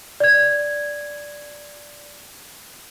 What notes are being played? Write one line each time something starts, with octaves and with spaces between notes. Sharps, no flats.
D5 G#6